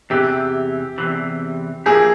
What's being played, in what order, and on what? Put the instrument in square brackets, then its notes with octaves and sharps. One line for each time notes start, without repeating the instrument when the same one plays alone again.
[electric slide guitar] E2 C3 E3 [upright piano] G4
[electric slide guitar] E2 C3 E3
[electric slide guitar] F3 A#3 E4 G4 [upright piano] G#4